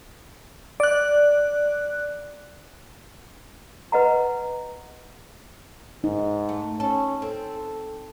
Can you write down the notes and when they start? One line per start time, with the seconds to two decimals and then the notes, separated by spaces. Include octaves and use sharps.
0.80 D5 F#6
3.92 B4 D#5 F#5 A#5
6.04 G#2 D#4
6.49 A3
6.80 C#4 A4
7.22 C4 A4